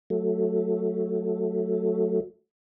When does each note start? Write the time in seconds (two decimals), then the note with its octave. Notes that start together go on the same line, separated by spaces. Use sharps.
0.10 F#3 A3